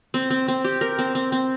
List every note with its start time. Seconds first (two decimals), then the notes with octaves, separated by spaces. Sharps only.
0.14 C4
0.30 C4
0.48 C4
0.64 G4
0.81 A#4
0.99 C4
1.15 C4
1.32 C4